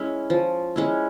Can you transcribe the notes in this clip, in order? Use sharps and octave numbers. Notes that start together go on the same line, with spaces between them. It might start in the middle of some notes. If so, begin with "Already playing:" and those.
Already playing: G#3 C#4 E4
F3
G#3 C#4 E4